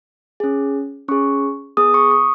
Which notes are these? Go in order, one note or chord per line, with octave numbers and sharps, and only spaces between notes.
C#4 G#4
C#4 G#4 C#6
B3 G#4 D#6
C#6
D#6